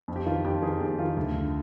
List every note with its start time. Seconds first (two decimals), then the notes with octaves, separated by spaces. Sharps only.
0.08 F2
0.16 G4
0.26 D#3 F4
0.44 F2 G4
0.62 D#3 G#4
0.80 F2 G4
0.99 D#3 F4
1.17 D2
1.34 D3